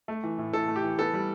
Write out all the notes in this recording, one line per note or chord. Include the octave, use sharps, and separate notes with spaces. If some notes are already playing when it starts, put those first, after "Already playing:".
A3
E3
A2
A2 A4
A3
G4
E3
B3 A4
G3